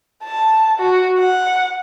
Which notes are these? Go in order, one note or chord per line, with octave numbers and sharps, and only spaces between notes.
A5
F#4
F#5